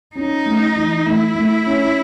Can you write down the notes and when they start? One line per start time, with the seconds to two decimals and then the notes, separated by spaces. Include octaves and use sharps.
0.16 C#4 D#4
0.46 A3
0.76 E3
1.06 A3 E4
1.35 A3
1.66 C#4